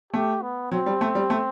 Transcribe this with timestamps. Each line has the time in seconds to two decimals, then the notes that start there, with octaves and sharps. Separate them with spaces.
0.13 A3 G4
0.42 B3
0.72 F#3 C4
0.86 G3
1.01 A3
1.15 G3
1.30 A3